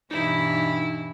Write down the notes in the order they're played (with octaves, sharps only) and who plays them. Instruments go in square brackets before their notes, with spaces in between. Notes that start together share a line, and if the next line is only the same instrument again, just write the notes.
[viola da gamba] G2 B2 E3 [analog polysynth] D#4 [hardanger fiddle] E4